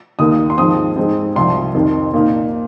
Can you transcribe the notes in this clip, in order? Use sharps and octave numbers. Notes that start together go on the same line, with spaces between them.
D#2 D#3 A#3 D#4 D#6
C6
G#2 F3 C4 D#6
G#2 G#3 C4
C2 C3 F3 C6
F2 C3 D#3
A#2 A#3 D#4